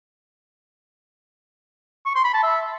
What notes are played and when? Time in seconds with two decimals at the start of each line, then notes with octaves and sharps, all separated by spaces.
2.06 C#6
2.15 C6
2.24 B5
2.34 A5
2.43 E5